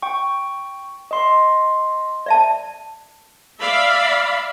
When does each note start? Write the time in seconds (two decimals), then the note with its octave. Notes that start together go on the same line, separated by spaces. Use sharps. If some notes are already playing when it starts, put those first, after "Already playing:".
0.02 G5 C#6
1.11 D#5 C6
2.26 D5 E5 A5
3.59 D5 E5 F5 B5